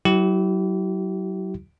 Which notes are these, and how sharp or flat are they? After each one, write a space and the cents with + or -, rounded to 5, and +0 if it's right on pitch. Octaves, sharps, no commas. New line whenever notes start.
F#3 +30 E4 +0 G4 -35